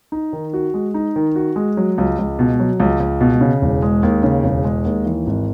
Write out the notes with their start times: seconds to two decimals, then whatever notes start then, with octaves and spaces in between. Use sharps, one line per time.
0.12 D#4
0.33 D#3
0.54 F#4
0.74 G#3
0.94 D#4
1.16 D#3
1.36 F#4
1.56 G#3
1.77 F#3
1.98 C#2
2.19 C#2
2.39 B2
2.60 F#3
2.80 C#2
3.00 C#2
3.21 B2
3.41 C#3
3.62 E1
3.82 G#3
4.03 D#2
4.23 C#3
4.44 E1
4.64 G#3
4.85 D#2
5.06 E3
5.27 G#1